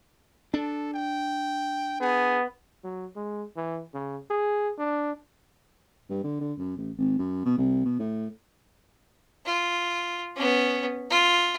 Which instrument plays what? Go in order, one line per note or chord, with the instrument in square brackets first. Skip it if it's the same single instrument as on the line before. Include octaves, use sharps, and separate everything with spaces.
[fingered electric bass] D4 [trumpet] A4
[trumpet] G5
[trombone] B3 [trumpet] G#4
[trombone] F#3
G#3
E3
C#3
G#4
D4
[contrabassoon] G2
D3
D3
F#2
A1
G#1
F#2
B2
C2
B2
A2
[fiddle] F4
B3 C#4
F4